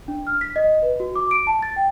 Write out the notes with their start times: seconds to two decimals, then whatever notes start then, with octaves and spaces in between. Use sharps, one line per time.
0.08 D4
0.27 F6
0.41 B6
0.56 D#5
0.82 B4
1.00 F#4
1.16 D6
1.31 D7
1.47 A5
1.63 A6
1.76 G5